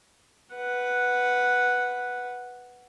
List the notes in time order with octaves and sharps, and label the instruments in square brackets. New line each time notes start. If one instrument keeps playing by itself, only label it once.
[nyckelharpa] B4 F#5